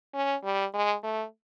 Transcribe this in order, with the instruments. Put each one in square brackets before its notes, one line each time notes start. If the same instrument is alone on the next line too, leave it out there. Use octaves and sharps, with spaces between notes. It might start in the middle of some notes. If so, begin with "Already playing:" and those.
[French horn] C#4
G3
G#3
A3